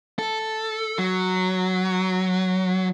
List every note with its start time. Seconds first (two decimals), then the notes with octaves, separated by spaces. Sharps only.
0.19 A4
0.98 F#3